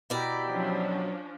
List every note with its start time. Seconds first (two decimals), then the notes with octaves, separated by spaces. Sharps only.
0.10 B2 E4 G4 D5 A#5
0.48 F3 F#3 C#4 D4